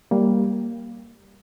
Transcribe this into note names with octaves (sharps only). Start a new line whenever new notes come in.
G3 A#3